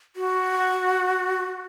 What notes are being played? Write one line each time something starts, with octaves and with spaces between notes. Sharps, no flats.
F#4